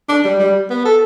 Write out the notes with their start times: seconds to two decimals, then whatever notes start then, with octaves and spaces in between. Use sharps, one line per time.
0.09 D4
0.24 G3
0.39 G3
0.70 B3
0.85 A4